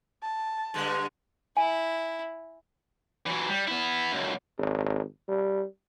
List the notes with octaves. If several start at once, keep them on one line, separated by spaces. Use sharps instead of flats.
A5
G2 D3 G#3
E4 G#5
E3 F#3
G3
B3 E4
C#2 F#2
G#1
G3